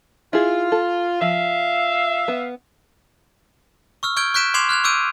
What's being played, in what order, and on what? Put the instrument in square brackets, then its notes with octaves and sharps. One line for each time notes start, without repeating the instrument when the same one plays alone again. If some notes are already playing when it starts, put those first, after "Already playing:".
[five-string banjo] E4 G#4 [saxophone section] F4
[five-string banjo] A4
[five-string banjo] F3 [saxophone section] E5 [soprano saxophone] F5
[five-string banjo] B3
[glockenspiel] C#6 E6 F6
C#6 F6 G6 G#6 D7 G7
C#6 F#6 G6 B6 D7 E7
C6 D6 G#6 C7 E7 F7
F6 F#6 G#6 F7
C#6 D6 E6 G6 D7 D#7